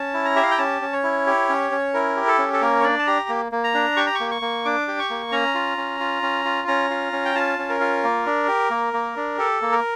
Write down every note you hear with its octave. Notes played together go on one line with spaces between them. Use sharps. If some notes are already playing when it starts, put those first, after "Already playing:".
Already playing: C#4 A5
E4
A#5
G4 E5
F5
G5
C#4 A5
C#4
C#5
E4
G4
C#4
C#4
E4 A#4
G4
A4
C#4
A4
A#3 A#4
C#5
D4 D5
A5
G4 A#5
A#3
A#3
A#5
D4
G4 C#6
A#5
C#6
A#3
C#6
A#3
D4 D6
G4
C#6
A#3
C#4 A#5
F4
C#4
F4
C#4
F4
C#4 A#5
F4
C#4
G5
F4 A5
C#4
A#4
F4
A#3
D4
G4
A#3
A#3
D4
G4 A4
A#3
A#4